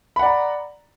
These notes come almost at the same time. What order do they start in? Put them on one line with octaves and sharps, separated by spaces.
B5 F#5 D5 A#5